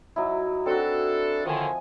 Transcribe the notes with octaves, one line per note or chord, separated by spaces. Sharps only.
F#3 D#4 E4
C4 D4 F#4 A4
A2 D3 D#3 F3 G#5